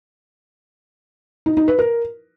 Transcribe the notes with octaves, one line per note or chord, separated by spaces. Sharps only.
D#4
D#4
B4
A#4